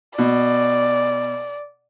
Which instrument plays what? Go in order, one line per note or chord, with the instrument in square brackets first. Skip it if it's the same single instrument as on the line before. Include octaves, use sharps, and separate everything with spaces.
[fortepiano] B2 [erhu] D5